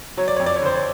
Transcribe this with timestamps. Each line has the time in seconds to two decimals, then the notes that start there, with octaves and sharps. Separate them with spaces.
0.18 F#3 C#5
0.28 D5
0.37 F2 C#5
0.46 D5
0.56 C#5
0.62 D3 C5
0.74 C#5